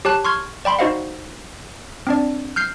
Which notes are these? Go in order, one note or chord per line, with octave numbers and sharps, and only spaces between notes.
G4 C#5 A5 F#6
C6 C#6 F6 G#6
D5 G5 B5 C6
D#4 F#4 C5 D#5 F5 F#5
C4 D4 D5
F6 G6 C7